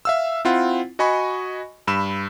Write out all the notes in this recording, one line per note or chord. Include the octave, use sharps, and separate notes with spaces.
E5 F5 E6
C4 E4 F4 F#5
F#4 D#5 G#5 B5 C#6
G2 B5 E6 E7